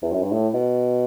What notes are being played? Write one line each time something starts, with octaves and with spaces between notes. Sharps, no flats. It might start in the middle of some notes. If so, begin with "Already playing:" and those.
E2
F#2
G2
A2
B2